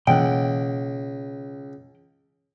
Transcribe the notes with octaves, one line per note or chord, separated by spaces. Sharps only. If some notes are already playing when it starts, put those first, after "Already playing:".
C#2 B2 E3 A#3 F#5 G5